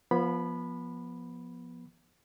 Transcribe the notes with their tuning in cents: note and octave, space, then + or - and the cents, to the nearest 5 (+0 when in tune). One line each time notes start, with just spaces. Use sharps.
F3 +0 B3 -30 B5 +0